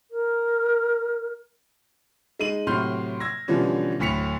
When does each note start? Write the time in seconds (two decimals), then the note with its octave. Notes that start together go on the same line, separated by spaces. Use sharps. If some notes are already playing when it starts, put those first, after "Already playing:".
0.11 A#4
2.39 G#3 D#4 D#7 F#7
2.67 A2 C3 F#3 C6 F6 G6
3.20 E6 G#6 A#6
3.48 B2 D3 E3 F3 G3 C#4
3.99 D1 D2 A2 B6 C#7 F7